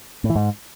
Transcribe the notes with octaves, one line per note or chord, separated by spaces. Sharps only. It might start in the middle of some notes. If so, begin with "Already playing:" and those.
A2
E3
G#2